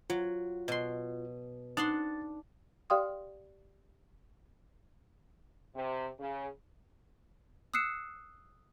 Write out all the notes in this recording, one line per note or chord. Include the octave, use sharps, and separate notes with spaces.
F#3 F4
B2 C6
D4 D#4 F#5 C6 A6
G4 D5 F5 G5 C6 D#6
C3
C#3
D#6 E6 F#6 C7 C#7 E7